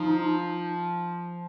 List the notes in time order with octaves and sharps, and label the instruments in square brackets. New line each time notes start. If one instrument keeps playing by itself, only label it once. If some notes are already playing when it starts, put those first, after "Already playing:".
Already playing: [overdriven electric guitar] F3 [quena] D#4